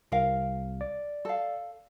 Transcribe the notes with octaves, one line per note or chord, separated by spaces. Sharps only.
C2 A#4 F5
D5
A4 F5